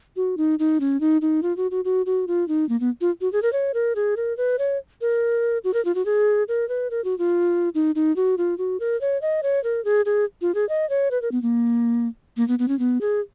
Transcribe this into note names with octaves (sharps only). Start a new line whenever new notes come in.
F#4
D#4
D#4
C#4
D#4
D#4
F4
F#4
F#4
F#4
F#4
F4
D#4
A#3
B3
F4
F#4
G#4
A#4
C#5
A#4
G#4
A#4
B4
C#5
A#4
F#4
A#4
F4
F#4
G#4
A#4
B4
A#4
F#4
F4
D#4
D#4
F#4
F4
F#4
A#4
C#5
D#5
C#5
A#4
G#4
G#4
F4
G#4
D#5
C#5
B4
A#4
B3
A#3
A#3
B3
B3
C#4
B3
G#4